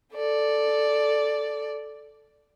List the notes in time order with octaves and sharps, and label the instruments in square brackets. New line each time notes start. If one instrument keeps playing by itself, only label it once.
[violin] A4 D5